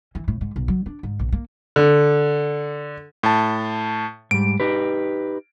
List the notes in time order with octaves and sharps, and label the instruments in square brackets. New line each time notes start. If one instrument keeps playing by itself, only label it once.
[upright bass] E3
A2
G#2
B1
F#3
D4
G#2
A#1
A#3
[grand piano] D3
[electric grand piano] A2 A5
[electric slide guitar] G#2 G3 [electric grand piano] D7
[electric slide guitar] D#4 G4 B4